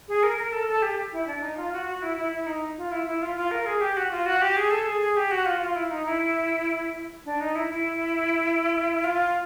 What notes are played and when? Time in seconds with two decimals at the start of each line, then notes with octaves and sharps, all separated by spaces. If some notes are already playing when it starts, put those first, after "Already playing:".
0.08 G#4
0.23 A#4
0.38 A#4
0.52 A4
0.68 A4
0.82 G4
1.13 E4
1.27 D4
1.42 D#4
1.57 F4
1.73 F#4
1.87 F#4
2.02 E4
2.17 E4
2.32 E4
2.47 D#4
2.78 F4
2.92 E4
3.06 E4
3.22 F4
3.37 F4
3.51 A#4
3.66 G#4
3.81 G4
3.97 F#4
4.11 F4
4.26 F#4
4.42 G4
4.57 G#4
4.71 A4
4.86 G#4
5.01 G#4
5.17 G4
5.31 F#4
5.46 F4
5.61 F4
5.76 E4
5.91 D#4
6.06 E4
7.25 D4
7.41 D#4
7.55 E4
7.70 E4
9.04 F4